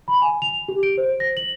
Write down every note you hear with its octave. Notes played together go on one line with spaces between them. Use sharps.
B5
G#5
F7
G4
D7
C5
A#6
F#7